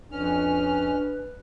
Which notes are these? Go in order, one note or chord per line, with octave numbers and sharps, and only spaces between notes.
F2 C#4 D4 B4 F6